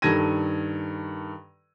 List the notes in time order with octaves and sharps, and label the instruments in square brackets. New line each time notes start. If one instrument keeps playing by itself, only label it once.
[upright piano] G2 D#3 A4 G#6 A#6 D#7